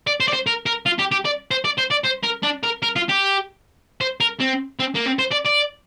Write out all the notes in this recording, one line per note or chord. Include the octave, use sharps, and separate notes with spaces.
D5
C5
D5
C5
A#4
A#4
F4
G4
G4
D5
C5
D5
C5
D5
C5
A#4
D4
A#4
A#4
F4
G4
C5
A#4
C4
C4
A#3
C4
C5
D5
D5